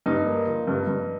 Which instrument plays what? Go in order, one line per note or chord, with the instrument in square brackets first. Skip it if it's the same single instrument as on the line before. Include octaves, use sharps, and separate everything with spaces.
[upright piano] G2 D#4
A#3
F3
G2
G2